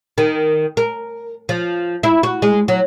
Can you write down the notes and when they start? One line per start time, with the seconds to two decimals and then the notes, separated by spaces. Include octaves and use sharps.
0.18 D#3
0.77 A#4
1.49 F3
2.03 E4
2.23 F#4
2.42 G#3
2.68 F#3